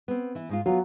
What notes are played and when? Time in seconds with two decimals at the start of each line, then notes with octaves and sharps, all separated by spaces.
0.08 B3 C4
0.35 E3 E4
0.49 G#2 G#3 F4
0.66 F#3 B3 F4